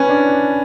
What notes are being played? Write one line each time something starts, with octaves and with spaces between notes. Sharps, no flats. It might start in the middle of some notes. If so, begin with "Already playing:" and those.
Already playing: C#4 B4
D4